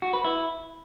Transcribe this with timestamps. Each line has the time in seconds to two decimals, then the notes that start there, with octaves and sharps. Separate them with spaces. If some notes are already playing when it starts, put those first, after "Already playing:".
0.02 F#4
0.13 B4
0.25 E4